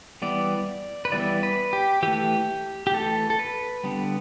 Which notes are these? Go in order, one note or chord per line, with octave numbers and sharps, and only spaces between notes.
E3 G3 B3 D5
B4
E3 G3 B3 D5
B4
G4
E3 A3 G4
G4
E3 A3 A4
A4
B4
D3 G3 B3